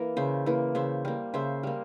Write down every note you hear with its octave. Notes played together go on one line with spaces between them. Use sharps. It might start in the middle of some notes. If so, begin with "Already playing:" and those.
Already playing: E3 A#3 A#4
C#3 C5 E5
E3 A#3
C#3 C5 E5
G3 A#3
C#3 C5 E5
G3 A#3